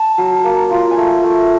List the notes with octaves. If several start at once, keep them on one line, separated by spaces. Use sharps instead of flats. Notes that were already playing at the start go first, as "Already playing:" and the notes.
Already playing: A5
F#3
A#3
F4
G#5
A3
A3